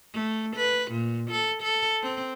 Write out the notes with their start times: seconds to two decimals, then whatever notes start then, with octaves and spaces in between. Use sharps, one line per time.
0.13 A3
0.56 B4
0.91 A#2
1.31 A4
1.62 A4
2.03 C4